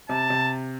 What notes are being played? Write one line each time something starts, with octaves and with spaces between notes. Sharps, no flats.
C3 A5
C3